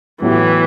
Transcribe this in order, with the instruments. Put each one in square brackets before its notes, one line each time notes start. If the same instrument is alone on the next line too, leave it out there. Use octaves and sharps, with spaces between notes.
[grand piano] A2 F#3 B3 E4 G4 [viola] E3